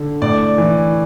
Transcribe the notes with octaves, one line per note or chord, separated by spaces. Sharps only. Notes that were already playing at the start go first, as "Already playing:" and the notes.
Already playing: D3
A2 D5
E3